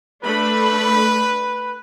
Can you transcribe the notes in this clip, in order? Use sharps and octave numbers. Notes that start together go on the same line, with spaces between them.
A3 D4 B4 B5